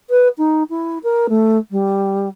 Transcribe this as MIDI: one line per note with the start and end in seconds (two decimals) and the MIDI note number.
0.10 0.28 71
0.38 0.63 63
0.70 0.98 64
1.04 1.27 70
1.29 1.58 57
1.71 2.29 55